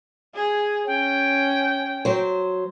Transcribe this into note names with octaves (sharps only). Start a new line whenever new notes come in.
G#4
C#4 G5
F#3 C5